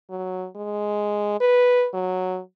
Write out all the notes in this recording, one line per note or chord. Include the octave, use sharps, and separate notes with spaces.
F#3
G#3
B4
F#3